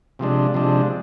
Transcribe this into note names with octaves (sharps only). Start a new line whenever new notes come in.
C3 F3 G#3 D4
C3 F3 G#3 D4